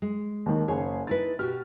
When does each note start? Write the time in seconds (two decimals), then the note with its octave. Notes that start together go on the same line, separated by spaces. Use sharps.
0.02 G#3
0.46 D#2 D#3
0.68 F#1 G#4 C#5
1.07 D#4 E4 B4 A6
1.39 B2 F#4 G4 F6